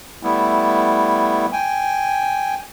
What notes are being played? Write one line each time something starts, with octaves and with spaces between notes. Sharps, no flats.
G3 A3 B3 E4
G5 G#5